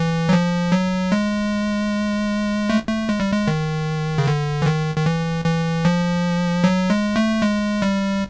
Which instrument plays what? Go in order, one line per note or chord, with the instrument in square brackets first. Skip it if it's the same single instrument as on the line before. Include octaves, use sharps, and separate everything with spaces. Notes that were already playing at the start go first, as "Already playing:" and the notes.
Already playing: [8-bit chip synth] E3
F#3
F3
F#3
G#3
A3
A3
G#3
G3
G#3
D#3
C#3
D3
E3
D#3
D#3
E3
E3
F3
F#3
G#3
A3
G#3
G3